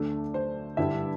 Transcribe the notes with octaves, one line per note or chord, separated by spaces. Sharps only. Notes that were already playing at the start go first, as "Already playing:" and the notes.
Already playing: D2 D3 A3 D4 D5
C5
G2 D3 G3 E4 E5